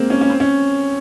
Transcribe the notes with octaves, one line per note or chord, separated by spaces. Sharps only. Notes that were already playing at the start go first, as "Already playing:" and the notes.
Already playing: G#3 A#3 C4
C#4
C#4
C4
C#4